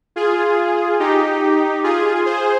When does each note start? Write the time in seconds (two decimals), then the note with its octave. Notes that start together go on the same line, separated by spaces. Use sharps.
0.16 F4 G#4
0.99 D#4 G4
1.84 F4 G#4
2.25 G#4 C5